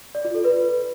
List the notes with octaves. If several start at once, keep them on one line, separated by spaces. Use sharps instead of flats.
D5
F4
A4
B4